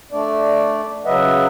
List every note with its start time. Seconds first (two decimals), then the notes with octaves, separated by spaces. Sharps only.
0.12 A3 D4 D5
1.05 C#3 F#3 B4 D#5 E5 F#5